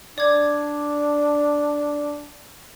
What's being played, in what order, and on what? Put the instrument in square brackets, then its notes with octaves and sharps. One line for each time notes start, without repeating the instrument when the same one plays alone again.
[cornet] D4 [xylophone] D5 D6 G#6